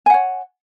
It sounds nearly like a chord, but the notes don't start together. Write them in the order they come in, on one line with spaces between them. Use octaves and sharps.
G#5 F#5 C#5